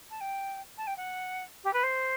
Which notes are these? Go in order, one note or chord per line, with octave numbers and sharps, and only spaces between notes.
A5
G5
A5
G5
F#5
G4
B4
C5